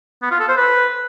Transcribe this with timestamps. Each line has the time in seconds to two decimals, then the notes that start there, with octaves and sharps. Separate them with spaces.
0.22 B3
0.31 F4
0.40 A4
0.48 C5
0.57 B4